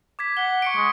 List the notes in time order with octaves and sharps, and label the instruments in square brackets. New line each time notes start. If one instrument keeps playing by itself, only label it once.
[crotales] D6 G#6 B6
[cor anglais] F#5 [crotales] B6 G7
[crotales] C#6 C#7 D7
[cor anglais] G#3